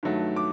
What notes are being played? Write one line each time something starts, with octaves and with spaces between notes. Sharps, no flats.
G2 D#3 F#3 A3
D6